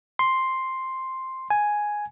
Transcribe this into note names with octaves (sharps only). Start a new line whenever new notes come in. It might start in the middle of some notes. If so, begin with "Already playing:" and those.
C6
G#5